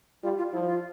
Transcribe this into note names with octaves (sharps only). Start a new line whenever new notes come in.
G3 F4
F4
F3 E4
F4